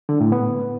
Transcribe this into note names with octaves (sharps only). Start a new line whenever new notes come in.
D3
A2
B3